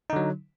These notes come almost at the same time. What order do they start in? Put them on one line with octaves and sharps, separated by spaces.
D#4 D3 F#3